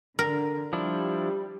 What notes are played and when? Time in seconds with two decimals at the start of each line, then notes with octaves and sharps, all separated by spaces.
0.19 D3 A#4
0.73 F3 G3 D4 E4